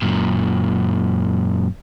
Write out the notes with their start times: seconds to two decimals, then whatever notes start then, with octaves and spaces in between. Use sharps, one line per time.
0.02 F#2 A#2